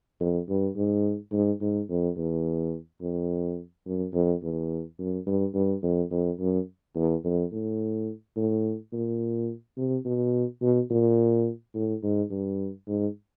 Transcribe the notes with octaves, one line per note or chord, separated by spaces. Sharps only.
F2
G2
G#2
G#2
G#2
F2
E2
F2
F#2
F2
E2
F#2
G2
G2
F2
F2
F#2
E2
F2
A2
A2
A#2
C3
B2
B2
A#2
A2
G#2
G2
G#2